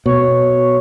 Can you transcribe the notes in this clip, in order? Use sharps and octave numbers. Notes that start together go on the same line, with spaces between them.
B2 C#5